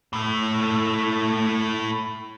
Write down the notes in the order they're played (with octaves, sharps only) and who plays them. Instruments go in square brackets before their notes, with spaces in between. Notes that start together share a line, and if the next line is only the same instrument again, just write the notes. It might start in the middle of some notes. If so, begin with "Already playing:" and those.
[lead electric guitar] A2 A3